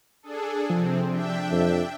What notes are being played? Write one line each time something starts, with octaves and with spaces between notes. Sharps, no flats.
D4 G#4 A4
C3 F3 C4
D4 E5 G5
F2